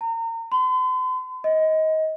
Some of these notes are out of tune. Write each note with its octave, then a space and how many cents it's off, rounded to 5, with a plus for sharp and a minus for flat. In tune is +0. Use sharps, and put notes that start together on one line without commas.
A#5 -35
C6 -45
D#5 +20